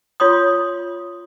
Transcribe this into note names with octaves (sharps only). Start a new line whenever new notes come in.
F4 C#5 C6 D#6